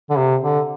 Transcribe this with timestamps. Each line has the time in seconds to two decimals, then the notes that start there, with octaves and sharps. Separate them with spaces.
0.10 D3
0.18 C3
0.42 D3